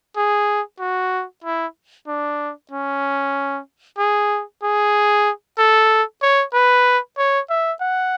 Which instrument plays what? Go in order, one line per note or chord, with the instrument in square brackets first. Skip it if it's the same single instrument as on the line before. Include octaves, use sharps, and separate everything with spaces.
[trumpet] G#4
F#4
E4
D4
C#4
G#4
G#4
A4
C#5
B4
C#5
E5
F#5